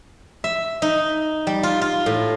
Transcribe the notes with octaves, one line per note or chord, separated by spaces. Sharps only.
E5
D#4
G3
F4
F4
A2